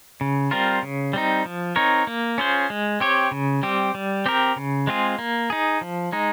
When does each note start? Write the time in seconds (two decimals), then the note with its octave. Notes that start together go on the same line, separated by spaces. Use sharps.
0.21 C#3
0.51 G3 C4 F4 A#4
0.82 C#3
1.13 G3 C4 D#4
1.45 F3
1.76 C4 D#4 A#4 C#5
2.07 A#3
2.38 C#4 F4 G#4 C5
2.70 G#3
3.00 C4 G4 C#5
3.31 C#3
3.63 G3 C4 G4
3.95 G3
4.26 C4 G4 A#4
4.56 C#3
4.87 G#3 C4 F4 G#4
5.19 A#3
5.50 D#4 G#4
5.81 F3
6.12 G#3 D#4